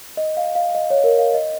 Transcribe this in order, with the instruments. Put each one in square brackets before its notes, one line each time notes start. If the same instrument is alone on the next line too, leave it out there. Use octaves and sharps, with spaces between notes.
[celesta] D#5
F5
F5
D#5
C#5
A#4
F5
D#5